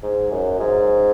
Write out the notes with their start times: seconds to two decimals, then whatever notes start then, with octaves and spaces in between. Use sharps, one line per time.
0.03 G#2
0.31 F#2
0.60 G#2